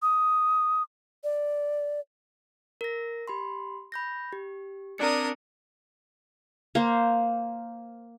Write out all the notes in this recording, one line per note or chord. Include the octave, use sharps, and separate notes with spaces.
D#6
D5
A#4 A#6
G4 B5 C6
B5 G6 A#6
G4
C4 D4 A#4 D5 D#6 C#7
A#3 C5